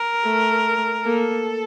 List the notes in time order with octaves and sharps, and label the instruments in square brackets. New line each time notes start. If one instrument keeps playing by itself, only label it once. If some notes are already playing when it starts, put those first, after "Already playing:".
Already playing: [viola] A#4
[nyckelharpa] A3
[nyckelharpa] A#3 [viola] A4